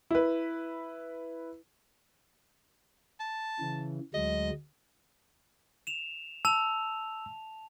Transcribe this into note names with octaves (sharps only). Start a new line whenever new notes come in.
E4 B4
A5
C#3 E3
D2 F#3 G#3 D#5
E7 F7
A5 E6 F7